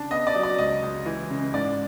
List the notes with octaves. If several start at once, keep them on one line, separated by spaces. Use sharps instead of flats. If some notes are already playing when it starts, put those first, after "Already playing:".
Already playing: C#3 D4 A5
B3 D#5
D5
F#3
D5
C#2 D#5
C#2
E3
C#3
G#2 D5